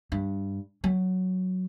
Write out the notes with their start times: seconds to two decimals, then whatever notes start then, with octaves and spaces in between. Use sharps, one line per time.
0.12 G2
0.84 F#3